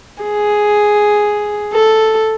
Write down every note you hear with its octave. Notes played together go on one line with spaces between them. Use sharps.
G#4
A4